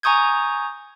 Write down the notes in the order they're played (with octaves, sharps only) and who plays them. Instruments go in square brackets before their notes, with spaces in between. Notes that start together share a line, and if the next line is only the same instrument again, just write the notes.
[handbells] G#5 A#5 C#6 D#6 G6 G#6